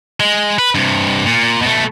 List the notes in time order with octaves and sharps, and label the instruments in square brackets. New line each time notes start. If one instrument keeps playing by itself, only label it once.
[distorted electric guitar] G#3
B4
G2 C3
A#2
B2 A3